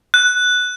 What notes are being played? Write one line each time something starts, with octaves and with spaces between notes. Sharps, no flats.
F#6